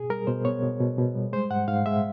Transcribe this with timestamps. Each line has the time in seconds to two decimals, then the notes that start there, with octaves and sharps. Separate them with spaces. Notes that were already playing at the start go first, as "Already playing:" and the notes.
Already playing: B2 G#4
0.10 G3 A#4
0.27 B2 C5
0.45 B3 C#5
0.63 B2
0.80 B2
0.98 B2
1.15 G3
1.33 G#3 C5
1.50 G#2 F#5
1.68 G#2 F5
1.86 G#3 E5